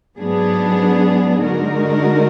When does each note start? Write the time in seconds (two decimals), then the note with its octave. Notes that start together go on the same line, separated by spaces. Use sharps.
0.17 G#2 F#3 B3 D4 G#4
1.42 D3 G#3 D#4 F#4 A#4